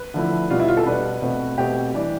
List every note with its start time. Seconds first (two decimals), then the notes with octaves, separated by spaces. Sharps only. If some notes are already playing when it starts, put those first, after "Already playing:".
Already playing: B4
0.14 D3 F3 A3 E4
0.50 B2 G3 D4 F4
0.60 E4
0.68 F4
0.77 A4
0.86 B2 G3 D4 B4
1.22 B2 A3 C4
1.58 B2 A3 C4 G4
1.94 E3 G3 D4